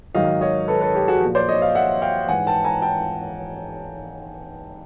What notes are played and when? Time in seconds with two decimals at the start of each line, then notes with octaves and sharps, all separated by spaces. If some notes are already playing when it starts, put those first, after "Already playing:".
0.15 G#2 D#3 F#3 D#5 F5
0.41 C#5 D#5
0.68 A4 B4
0.81 A4 B4
0.95 G4
1.08 F#4 G#4
1.22 A#2 F3
1.35 C5 D5
1.49 C#5 D#5
1.62 D#5 F5
1.75 E5 F#5
2.02 F5 G5
2.28 G#2 E3 F#5 G#5
2.47 G5 A5
2.65 G#5 A#5
2.82 G5 A5